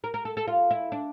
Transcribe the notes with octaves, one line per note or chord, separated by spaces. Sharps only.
A#4
A#4
A4
A4
F4
E4
D4